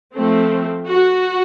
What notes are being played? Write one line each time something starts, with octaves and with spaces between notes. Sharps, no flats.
F3 A3 C4
F#4